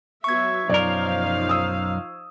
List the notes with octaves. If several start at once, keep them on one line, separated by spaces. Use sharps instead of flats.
F#3 B3 E5 C#6 G#6
B1 F#2 F3 D#4 A#4 D5 F5
D#6 E6